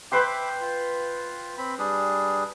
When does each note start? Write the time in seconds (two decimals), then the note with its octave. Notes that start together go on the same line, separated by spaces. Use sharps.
0.12 B4 C5 E5 G5 B5 D6
0.61 F4
1.58 C4 B5
1.79 G3 D4 G#4